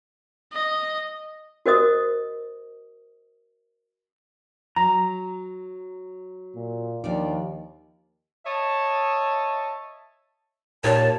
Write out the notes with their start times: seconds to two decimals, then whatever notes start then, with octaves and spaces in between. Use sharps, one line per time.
0.53 D#5
1.66 F#4 A#4 C5 D#5 D#6
4.76 F#3 A#5
6.56 A#2
7.04 D#2 F3 D4 D5
8.46 C#5 D#5 E5 A5
10.84 D#2 A#2 C#5 A5